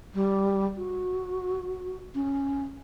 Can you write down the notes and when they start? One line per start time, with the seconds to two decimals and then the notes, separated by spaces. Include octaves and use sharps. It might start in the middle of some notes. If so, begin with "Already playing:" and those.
0.14 G3
0.76 F#4
2.15 C#4